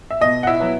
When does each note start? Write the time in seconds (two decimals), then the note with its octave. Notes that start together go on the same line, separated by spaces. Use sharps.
0.11 E5
0.21 B2 D#5
0.43 F#5
0.47 E4 E5
0.60 F#3 B3